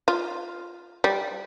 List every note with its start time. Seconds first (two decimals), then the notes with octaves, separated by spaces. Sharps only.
0.08 F4
1.04 G3